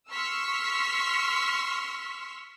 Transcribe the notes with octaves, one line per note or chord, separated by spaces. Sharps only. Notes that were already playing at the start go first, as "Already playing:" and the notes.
C6 C#6 E6 F6 B6